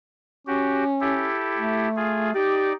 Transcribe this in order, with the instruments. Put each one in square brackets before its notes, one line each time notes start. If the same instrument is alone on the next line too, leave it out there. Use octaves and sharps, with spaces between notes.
[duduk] C#4 [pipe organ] F#4 G4
[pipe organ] E4 G4 A4
[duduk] A3
[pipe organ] F4 G#4
[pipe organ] D#4 D5 [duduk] G4